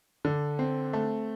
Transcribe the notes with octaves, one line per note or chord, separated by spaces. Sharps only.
D3
C4
A3